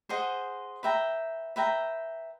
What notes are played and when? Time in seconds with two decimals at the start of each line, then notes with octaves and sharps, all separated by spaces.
0.09 G#4 C5 D#5 F#5
0.83 B4 E5 G5 A#5
1.56 B4 E5 G5 A#5